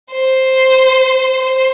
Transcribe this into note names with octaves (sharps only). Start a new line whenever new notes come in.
C5
C5